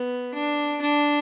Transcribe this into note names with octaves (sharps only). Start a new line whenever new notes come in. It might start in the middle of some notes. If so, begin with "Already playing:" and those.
Already playing: B3
D4
D4